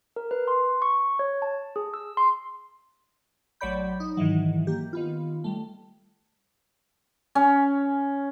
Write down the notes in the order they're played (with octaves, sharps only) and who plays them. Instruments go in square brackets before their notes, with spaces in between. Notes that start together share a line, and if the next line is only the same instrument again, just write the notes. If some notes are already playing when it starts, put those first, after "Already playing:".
[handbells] A#4
B4
C6
C#6
C#5
A5
G#4
E6
C6
[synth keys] A1 F#3 C#5 D5 B5 G6
D#4
G#2 D#3 E3 F#3
A#3 G4
D#3 B3 F4
G3 A3
[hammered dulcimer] C#4